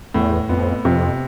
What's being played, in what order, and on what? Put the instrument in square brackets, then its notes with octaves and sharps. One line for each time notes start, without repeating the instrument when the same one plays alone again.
[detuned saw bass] E2 [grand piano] A2
[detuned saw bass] F2 [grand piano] B3
[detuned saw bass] F2 [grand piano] C3